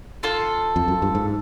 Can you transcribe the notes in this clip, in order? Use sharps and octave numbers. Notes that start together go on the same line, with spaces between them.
F4 A4 C5
F2
F#2
G2
G#2